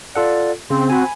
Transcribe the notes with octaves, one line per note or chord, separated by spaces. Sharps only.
F4 A4 D5 F#5
C#3 C4 C6
F#4 G#5 B5